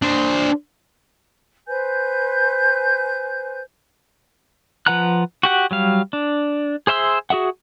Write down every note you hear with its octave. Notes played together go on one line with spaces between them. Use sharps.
D4 C5
B4 C5 G#5 G6
F3 B4 F#5 A#5 F#6
F#4 G4 F#5
F#3 G3 F5
D4
G#4 C5 E5 C6 E6
F#4 G#4 E5 F#5